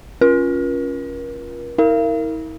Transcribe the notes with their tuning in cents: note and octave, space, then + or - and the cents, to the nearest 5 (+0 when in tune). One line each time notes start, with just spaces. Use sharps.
C#4 +0 F4 +0 A#4 +40
E4 -45 A#4 -15 F5 -45